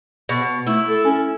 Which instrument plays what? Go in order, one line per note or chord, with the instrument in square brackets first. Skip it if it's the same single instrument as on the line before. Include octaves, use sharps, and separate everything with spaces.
[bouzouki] B2
[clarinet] A3 [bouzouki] E4
[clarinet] A4
C#4